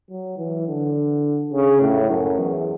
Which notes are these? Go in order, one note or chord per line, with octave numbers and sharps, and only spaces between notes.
F#3
E3
D3
C#3
A2
F#2
E2